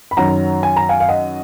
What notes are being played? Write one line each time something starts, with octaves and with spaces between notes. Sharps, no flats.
B5
F#2 D#3 F#3 C#4 F#5 A#5
G#5
A#5
F5 G#5
F5
D#5 F#5